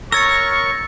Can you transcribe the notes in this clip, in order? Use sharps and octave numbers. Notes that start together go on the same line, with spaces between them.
A#4 C#5 C#6 E6 A6 C#7